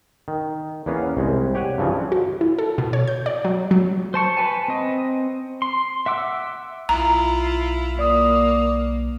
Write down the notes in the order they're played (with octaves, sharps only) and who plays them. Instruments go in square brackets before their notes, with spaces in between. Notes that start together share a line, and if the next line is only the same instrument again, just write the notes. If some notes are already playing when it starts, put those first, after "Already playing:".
[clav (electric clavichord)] D#3
E2 A#3 B3 C#4 F5
C2 G#3
G4 C#5 F#5 G#5
G2 C#3 E3 F3
[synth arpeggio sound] F#4
E4
A4
B2
C#5
G6
D5
F#3
F#3
[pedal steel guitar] C5 A5 C#6
B4 G#5 A5
C4 D#5
C6
E5 F#5 D6 E6
[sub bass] B1 [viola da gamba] E4 F4 [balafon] A#5
[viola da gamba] A#3 [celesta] D5 D#6